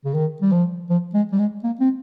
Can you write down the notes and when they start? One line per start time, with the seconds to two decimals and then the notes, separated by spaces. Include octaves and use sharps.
0.05 C#3
0.14 D#3
0.42 G3
0.52 F3
0.90 F3
1.14 G#3
1.32 G3
1.39 G#3
1.64 A#3
1.80 C4